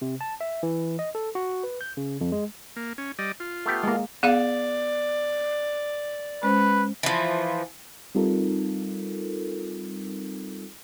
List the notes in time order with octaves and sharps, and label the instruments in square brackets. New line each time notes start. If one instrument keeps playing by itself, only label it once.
[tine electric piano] C3
A5
E5
E3
D#5
A4
F#4
B4
G6
C#3
F2
G#3
[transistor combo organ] A#3
C#4
G3 D5 D#5
F4
[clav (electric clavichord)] A3 B3 G4
[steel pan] G#3 A#3
[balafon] B3 G#4 F5 [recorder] D5
[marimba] G#3 C#4 C5 [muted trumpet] B4
[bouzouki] E3 F3
[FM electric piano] G3 C4 D#4 F4 A4 A#4